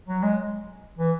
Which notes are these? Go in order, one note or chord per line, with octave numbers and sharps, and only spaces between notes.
F#3
G#3
E3